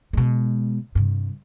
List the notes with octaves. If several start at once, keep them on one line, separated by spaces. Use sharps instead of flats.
B2 G#3
G2 C3